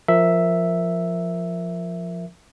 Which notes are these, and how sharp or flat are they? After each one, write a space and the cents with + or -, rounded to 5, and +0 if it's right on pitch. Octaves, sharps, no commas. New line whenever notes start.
F3 +0 A#4 +0 E5 +0